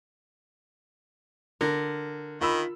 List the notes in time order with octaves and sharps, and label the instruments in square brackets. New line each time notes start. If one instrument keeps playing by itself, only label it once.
[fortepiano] D3 [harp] A#4
[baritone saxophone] D#3 [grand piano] F4 B5 E6